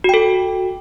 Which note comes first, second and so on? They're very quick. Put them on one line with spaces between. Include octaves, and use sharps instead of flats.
F#4 G5 A4